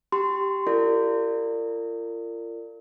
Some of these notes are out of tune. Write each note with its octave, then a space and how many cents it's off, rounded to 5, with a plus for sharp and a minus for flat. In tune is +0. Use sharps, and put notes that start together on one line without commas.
G4 +0 C6 -25
F4 -35 A#4 -35 D5 +0